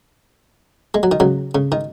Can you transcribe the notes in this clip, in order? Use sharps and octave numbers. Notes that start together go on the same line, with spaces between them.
G#3
F#3
D#3
C#3 F#3
C#3
D#3